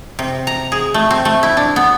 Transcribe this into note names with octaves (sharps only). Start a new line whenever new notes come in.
C3
A#5
G#4
A3
C4
A3
E4
D4
B3